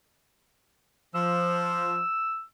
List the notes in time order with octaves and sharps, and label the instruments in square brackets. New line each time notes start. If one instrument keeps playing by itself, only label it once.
[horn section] F3 [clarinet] E6